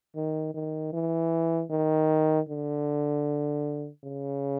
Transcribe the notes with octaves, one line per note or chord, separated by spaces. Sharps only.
D#3
D#3
E3
D#3
D3
C#3